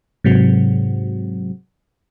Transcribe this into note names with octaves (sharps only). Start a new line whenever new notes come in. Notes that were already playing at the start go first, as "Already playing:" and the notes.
G#2 C3 F#3